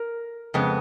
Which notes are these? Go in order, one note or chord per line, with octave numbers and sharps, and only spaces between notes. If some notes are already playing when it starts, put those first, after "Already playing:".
Already playing: A#4
F2 C#3 G#3 B3